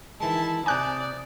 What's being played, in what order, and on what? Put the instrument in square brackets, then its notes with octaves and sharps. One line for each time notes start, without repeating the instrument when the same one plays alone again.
[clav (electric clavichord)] D#3 E3 G#3 [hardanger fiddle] E4 [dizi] A5
[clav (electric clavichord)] C3 A#5 [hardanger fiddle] D5 [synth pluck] G#5 F#6 G6 [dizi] D#6